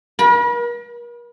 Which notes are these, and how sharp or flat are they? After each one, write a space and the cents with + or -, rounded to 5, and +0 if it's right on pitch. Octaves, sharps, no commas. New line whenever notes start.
A#4 +40 B5 -30